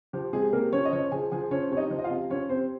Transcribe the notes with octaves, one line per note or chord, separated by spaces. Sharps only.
F3 G4
C3 G#3 G#4
C3 A#3 A#4
F3 C#4 C#5
D#5
F3 C#4 C#5
F3 G#4 G#5
F3 G#4 G#5
F3 C#4 C#5
C3 C#5
D#4 D#5
F3
D#5
F4 F5
C3
F3 C#4 C#5
C3 C4 C5